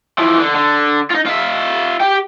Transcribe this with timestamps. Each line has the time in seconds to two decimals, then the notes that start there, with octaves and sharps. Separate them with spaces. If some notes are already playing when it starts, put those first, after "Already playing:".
0.18 E3 F3
0.39 D3
0.55 D3
1.10 D#4 F4
1.26 F4 E5
2.00 G4 G5